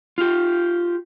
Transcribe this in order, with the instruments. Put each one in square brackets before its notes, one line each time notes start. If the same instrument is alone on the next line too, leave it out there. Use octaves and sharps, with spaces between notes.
[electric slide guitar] F4 G4